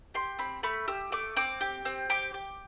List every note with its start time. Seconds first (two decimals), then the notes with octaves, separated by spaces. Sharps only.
0.14 G4 C6
0.39 C4 B5
0.63 A3 B5
0.88 G4 E6
1.12 A3 D6
1.36 C4 D6
1.61 G4
1.85 C4
2.10 G4 D6
2.34 G4